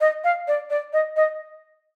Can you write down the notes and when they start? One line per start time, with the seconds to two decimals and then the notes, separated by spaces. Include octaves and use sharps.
0.01 D#5
0.24 F5
0.47 D5
0.70 D5
0.93 D#5
1.16 D#5